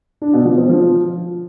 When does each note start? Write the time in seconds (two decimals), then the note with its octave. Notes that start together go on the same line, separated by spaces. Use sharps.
0.22 D4
0.34 B2
0.45 F3
0.57 C4
0.69 F3